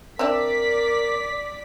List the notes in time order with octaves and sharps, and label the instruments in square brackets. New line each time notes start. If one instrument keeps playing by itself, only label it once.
[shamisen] C4 D4 E5 [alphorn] A#4 [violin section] D5 B6